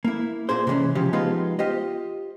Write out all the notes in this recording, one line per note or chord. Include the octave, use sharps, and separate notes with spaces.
A#3 E4
A#2 A#3 G#4 C5
C3 E3 G3 G#3 C#4
C#3 F3 C#4 G4
F3 G#3 B3 D#4 F4 G4
F4 G4 C5 D#5